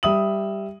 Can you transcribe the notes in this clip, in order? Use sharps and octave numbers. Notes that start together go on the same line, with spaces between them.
G3 E5 D#6 F#7